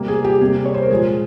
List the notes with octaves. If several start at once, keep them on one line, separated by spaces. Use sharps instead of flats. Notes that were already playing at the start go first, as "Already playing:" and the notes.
Already playing: C3 G3 A#3
G#4
G4
C3 G3 A#3 G#4
C#5
C5
A#4
A#2 F3 G#3 G#4